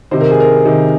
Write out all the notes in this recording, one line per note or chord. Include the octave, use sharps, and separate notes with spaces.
C3 D#3 C5
A#4
G#4
A#4
C3 D#3